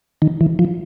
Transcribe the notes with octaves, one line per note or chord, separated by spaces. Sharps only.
D#3
E3
F3